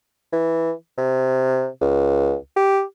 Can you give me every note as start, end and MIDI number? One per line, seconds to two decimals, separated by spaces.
0.32 0.72 52
0.97 1.67 48
1.81 2.34 37
2.56 2.82 67